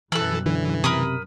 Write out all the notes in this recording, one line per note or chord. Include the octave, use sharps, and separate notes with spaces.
F#2 B2 E3 G3 A4 E6 F#6
D3 E3
C3 A#4 B5 D#6